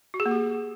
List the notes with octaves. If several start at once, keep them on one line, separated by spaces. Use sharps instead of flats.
F#4
G#4
A#3
G4